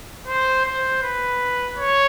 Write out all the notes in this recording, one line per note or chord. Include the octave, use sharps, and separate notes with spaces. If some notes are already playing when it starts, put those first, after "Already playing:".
C5
C5
B4
C#5